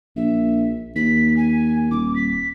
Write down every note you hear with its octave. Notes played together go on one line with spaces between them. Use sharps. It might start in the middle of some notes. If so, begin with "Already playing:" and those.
A#1 E5
D#2 B6
G#5
D#1 D6
B6